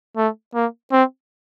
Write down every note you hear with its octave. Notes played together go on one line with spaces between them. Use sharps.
A3
A#3
C4